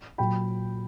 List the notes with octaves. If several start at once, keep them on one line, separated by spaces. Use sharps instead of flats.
A#2 F#3 G5 B5